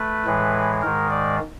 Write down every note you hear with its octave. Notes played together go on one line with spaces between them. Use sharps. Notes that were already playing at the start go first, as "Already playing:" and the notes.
Already playing: A3 B4
A2 E3 G#3
G#2 D#3 G#3 A#4
D5